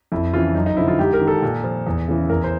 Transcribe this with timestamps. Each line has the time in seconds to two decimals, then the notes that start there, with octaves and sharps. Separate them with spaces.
0.12 F2 E4
0.33 C#3 E3 F4
0.55 F#2 D#4
0.66 D#4
0.77 D3 F3 E4
0.88 F4
0.99 G#2 G4
1.13 A#4
1.21 D#3
1.28 A4
1.42 A#2
1.64 F3
1.87 E2
2.08 C#3 E3
2.29 E2 A#4
2.44 C5